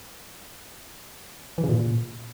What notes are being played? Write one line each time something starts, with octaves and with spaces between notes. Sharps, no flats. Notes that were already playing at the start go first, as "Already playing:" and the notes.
E3
C#3
A#2